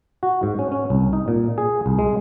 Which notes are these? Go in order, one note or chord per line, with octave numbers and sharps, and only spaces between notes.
F#4
G#2
C#4
C#4
C2
D#4
A#2
G#4
C2
G#3